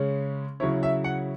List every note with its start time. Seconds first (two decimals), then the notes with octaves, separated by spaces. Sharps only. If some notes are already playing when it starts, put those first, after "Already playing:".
Already playing: C#3 G#3 C#4
0.60 C#3 F#3 C#4 E4 C#5
0.83 E5
1.04 F#5